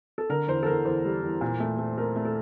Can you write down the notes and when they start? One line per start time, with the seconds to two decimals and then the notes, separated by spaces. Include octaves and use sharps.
0.18 A4
0.29 D3 A#4
0.48 E2 C5
0.63 A4
0.66 E2 A#4
0.85 E2 C5
1.05 G3
1.22 E2
1.41 A#2
1.60 A3
1.79 A3
1.98 A3 A#4
2.16 A3
2.25 A4